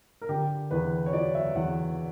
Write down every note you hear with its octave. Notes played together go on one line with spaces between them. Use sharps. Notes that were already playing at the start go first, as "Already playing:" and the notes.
A#4
D3 G4
E2 B4
C#5
F#3 D5
E5
E2 F#5